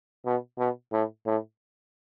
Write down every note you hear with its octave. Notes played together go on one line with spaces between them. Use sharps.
B2
B2
A2
A2